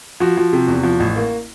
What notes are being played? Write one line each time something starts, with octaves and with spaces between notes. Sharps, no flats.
F3 F#4
F3
C3
E2
F3
A1
A#3